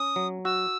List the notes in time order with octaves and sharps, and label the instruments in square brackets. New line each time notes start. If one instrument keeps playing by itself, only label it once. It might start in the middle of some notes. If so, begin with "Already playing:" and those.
Already playing: [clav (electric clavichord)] C#4 [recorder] D#6
[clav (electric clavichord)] F#3
[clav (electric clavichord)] F#4 [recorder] E6